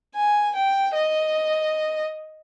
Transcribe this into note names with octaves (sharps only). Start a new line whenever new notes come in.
G#5
G5
D#5